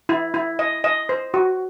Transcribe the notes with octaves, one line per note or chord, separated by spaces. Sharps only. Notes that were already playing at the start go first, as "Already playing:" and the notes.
E4
E4
D#5
D#5
C5
F#4